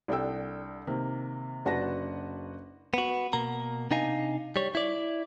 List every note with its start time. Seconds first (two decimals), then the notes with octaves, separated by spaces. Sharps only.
0.08 C2 D4 A4 G5 E6
0.87 C3 D#3 A#3
1.65 F#1 D4 F#4 B4 A5 A#6
2.94 B3 F#4
3.33 B2 A#3 A#5
3.91 C3 D4 D#4 D#5 F5 G#5
4.56 G3 C#5
4.75 E4 D5